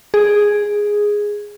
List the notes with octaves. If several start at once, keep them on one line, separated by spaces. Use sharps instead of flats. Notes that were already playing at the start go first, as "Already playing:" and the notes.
G#4